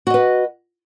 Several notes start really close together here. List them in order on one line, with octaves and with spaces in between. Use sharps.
F#4 D#5 B4